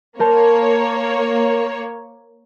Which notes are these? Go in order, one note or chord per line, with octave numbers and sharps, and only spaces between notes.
A#3 A#4 C5 C#5 A5